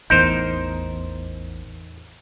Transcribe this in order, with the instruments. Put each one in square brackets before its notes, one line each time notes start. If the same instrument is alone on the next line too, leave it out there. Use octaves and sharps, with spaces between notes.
[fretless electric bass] A1 E2 [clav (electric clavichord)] D#4 A#4 C5 [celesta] G6